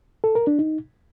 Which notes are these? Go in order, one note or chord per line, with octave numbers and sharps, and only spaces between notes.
A4
A#4
D4
D#4